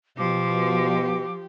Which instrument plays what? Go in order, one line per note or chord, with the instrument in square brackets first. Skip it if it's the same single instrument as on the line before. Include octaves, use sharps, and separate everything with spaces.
[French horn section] B2 [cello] F3 [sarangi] G4 [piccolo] D6